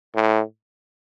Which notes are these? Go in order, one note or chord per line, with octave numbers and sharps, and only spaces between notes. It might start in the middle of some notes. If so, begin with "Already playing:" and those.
A2